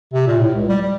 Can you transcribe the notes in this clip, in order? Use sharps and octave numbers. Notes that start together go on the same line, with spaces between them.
C3
A#2
A2
C#2
G3
G3